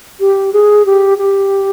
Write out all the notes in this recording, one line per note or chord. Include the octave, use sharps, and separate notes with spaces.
G4
G#4
G4
G4